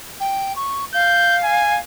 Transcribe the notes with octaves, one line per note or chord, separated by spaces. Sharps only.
G5
C#6
F5 G6
G#5